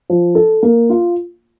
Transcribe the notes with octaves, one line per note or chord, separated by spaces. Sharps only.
F3
A4
A#3
F4